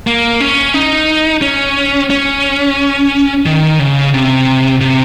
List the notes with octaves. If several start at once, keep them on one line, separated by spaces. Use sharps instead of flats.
A#3
C#4
D#4
C#4
C#4
D#3
C#3
C3
C3